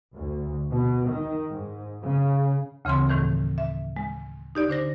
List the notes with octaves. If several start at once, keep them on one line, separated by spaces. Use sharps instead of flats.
D2
B2
D#3
G#2
C#3
D2 C#3 E3 C4 C6
A2 D#3 E3 A3
E5
G#3
D#4 G4 D5
D3 D4 C5 A#6